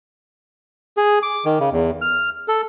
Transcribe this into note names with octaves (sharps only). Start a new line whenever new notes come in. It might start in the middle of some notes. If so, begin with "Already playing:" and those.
G#4
D6
D#3
C#3
E2
F6
A4